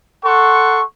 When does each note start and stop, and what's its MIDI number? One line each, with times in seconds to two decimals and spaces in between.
0.24 0.83 69
0.24 0.83 78
0.24 0.83 84
0.24 0.83 85